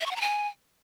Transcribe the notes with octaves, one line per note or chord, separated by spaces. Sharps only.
E5
C#6
F#5
A#5
G#5